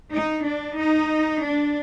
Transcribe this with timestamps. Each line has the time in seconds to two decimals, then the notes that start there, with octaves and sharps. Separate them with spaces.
0.15 D#4
0.47 D4
0.79 D#4
1.43 D4